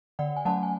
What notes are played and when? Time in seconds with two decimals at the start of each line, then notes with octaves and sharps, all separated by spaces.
0.19 D3 D5 F#5
0.36 G#5
0.45 F#3 A3 C#4 F#5 A5
0.63 G#5